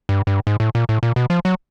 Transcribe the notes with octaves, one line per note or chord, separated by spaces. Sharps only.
G2
G2
G#2
A2
A#2
A2
A#2
B2
F3
F#3